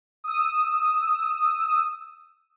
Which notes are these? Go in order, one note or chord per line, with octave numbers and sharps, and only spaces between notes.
D#6 E6